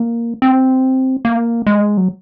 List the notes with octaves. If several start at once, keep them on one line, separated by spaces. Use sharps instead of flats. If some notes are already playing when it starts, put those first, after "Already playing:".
Already playing: A#3
C4
A#3
G#3
F#3